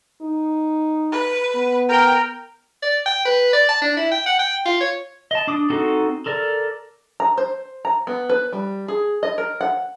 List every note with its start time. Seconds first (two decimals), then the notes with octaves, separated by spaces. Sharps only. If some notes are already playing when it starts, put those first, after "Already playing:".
0.21 D#4
1.12 B4
1.55 B3
1.89 A#4 G5
2.83 D5
3.06 G5
3.25 B4
3.53 D5
3.69 A5
3.82 D4
3.97 E4
4.11 G5
4.26 F#5
4.39 G5
4.65 F4
4.81 C#5
5.31 D#5 A5
5.47 D4 D6 D#6
5.70 C4 D#4 F#4 A4
6.26 A4 A#4 D5
7.20 A#5
7.38 C5
7.85 A#5
8.07 B3
8.29 B4
8.53 G3
8.88 G#4
9.23 D#5
9.38 A#4
9.61 F#5